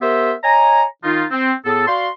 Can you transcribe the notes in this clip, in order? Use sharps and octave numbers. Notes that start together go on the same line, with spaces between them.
B3 G4 A#4 C5 E5
C#5 D#5 G#5 A#5
D#3 D#4 F4
C4
A2 B3 G#4 A4
F#4 D5 F5 C6